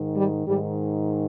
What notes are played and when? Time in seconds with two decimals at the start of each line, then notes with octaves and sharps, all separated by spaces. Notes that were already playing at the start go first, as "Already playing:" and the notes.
Already playing: G#2 D#3
0.15 G3
0.46 G#2 D#3 G3